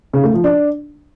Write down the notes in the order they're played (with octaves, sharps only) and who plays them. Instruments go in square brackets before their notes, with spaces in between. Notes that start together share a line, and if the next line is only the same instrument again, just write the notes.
[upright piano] C#3
A3
F3
D4